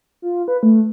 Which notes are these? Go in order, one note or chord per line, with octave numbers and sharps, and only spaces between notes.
F4
B4
A3